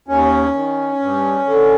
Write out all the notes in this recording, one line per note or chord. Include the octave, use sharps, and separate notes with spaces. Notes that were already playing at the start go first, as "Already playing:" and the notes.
D#2 C#4
D#3
G2
D3